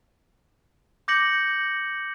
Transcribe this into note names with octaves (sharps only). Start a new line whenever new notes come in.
D6 G6 A#6 C#7 F#7